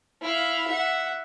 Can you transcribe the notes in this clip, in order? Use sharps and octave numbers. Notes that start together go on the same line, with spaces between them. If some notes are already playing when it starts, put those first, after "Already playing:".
E4 F5
E5 F#5